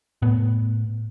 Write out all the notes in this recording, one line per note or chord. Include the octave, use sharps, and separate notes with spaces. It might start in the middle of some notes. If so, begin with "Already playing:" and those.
A2 B3